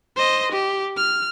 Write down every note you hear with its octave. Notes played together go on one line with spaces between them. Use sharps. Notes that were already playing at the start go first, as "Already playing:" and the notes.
C5 D#5
G4
F6